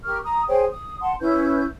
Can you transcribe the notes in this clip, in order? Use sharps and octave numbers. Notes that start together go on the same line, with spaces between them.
G4 A#4 C#6 F6
A#5 D#6
G#4 C5 C#5 G5
D#6
F#5 A5 C6
C#4 E4 B4 G6